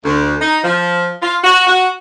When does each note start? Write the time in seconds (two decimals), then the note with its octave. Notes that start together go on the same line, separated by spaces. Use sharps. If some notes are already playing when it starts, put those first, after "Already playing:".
0.04 D2
0.40 D#4
0.63 F3
1.21 F4
1.43 F#4
1.66 F#4